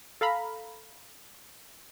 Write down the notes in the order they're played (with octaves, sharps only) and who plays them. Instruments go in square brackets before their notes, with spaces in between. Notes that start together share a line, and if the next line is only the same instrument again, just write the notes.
[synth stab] A4 F5 A#5 B5